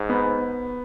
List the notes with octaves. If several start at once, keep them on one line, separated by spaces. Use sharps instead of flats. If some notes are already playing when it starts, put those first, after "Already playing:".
Already playing: G#2
B3